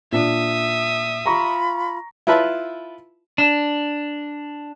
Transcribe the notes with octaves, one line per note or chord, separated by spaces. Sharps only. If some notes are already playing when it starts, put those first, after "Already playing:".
A#2 D4 E5 D#6
F4 A#5 B5 C#6
E4 F4 B4 E5 A5 B5
D4